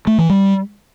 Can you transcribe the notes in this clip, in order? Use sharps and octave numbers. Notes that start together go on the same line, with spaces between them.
A3
E3
G3